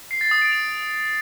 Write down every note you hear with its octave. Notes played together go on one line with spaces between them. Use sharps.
C7
A6
D#6
D7
F7